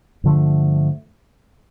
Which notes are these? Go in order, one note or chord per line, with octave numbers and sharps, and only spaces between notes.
G2 D3 F3 A3